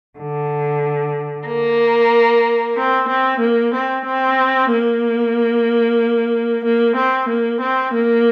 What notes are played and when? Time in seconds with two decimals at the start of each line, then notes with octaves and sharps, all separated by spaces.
0.18 D3
1.47 A#3
2.76 C4
3.09 C4
3.41 A#3
3.74 C4
4.06 C4
4.70 A#3
6.64 A#3
6.96 C4
7.29 A#3
7.61 C4
7.94 A#3